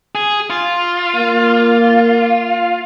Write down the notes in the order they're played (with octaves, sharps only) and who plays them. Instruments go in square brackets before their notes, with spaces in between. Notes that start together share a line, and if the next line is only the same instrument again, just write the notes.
[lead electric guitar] G#4
F4
[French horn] A#3